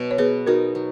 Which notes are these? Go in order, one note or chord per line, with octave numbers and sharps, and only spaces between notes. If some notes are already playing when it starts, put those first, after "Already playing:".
Already playing: B2 F#3
C#5
B3 G#4 B4
D#4 F#4 A#4
F#3